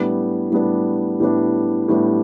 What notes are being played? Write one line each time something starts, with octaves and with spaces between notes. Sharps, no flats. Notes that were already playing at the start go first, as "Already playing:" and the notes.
Already playing: A2 G3 B3 D4
A2 G3 B3 D4
A2 G3 B3 D4
A2 G3 B3 D4